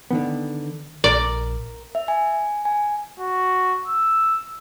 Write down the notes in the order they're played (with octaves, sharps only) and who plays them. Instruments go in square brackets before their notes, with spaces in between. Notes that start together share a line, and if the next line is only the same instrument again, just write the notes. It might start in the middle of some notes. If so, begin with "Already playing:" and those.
[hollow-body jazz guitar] D3 D#3 B3
[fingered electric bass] A#1 [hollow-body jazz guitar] A#4 [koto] D5
[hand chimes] E5
G#5
G#5
[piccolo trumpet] F#4
E6